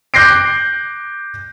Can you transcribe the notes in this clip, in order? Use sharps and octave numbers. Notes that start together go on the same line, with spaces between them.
D6 F#6 G6 A#6 C7 D7